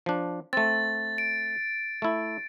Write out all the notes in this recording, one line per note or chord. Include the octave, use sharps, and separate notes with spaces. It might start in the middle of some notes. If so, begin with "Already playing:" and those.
F3 D4
A3 C4 A6
D7
A3 E4